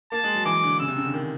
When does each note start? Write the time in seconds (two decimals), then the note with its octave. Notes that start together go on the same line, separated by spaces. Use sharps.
0.12 A#3 A5
0.24 G#3
0.35 F#3
0.45 E3 D6
0.63 D3
0.79 C#3 E6
0.88 C3
0.97 C#3
1.05 D3
1.14 D#3